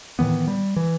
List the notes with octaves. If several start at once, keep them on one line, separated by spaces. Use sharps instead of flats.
A2 D#3 E3 B3
G3
E3